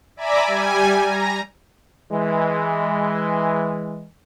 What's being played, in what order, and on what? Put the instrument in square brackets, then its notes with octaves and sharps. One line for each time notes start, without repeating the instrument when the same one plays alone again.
[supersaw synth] D5 E5 G#5 A#5 B5 D6
G3 G#5
A#5
[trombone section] E3 G#3